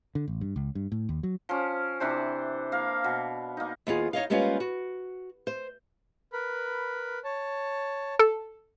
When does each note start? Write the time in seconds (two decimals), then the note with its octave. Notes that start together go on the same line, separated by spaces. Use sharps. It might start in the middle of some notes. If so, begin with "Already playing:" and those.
0.15 D3
0.28 A1
0.41 G2
0.56 C#2
0.75 G2
0.92 A2
1.09 D#2
1.23 F#3
1.49 F3 C#4
2.00 C3 E3 D4 C5
2.72 A#3 F5
3.04 B2
3.57 A#3 D#4
3.87 D#2 B3 F4 G#4
4.13 D#4 C#5 D#5 F5
4.30 G3 G#3 A#3 B3 C#4 F4
4.60 F#4
5.47 C5
6.33 A#4 B4 B5
7.24 C#5 A5
8.19 A4